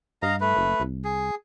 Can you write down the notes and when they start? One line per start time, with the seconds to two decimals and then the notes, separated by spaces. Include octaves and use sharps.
0.22 G2 D#5 F5 A#5
0.41 A3 B4
0.57 F#1
0.80 C2
1.05 G#4